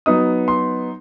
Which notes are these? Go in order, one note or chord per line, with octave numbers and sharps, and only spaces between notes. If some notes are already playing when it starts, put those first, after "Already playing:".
F#3 B3 D#4 D#6
C6